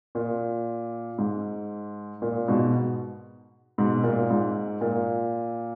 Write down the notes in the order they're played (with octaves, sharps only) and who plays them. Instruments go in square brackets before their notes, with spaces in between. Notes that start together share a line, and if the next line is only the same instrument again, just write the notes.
[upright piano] A#2
G#2
A#2
G#2 B2
G#2 B2
A#2
G#2
A#2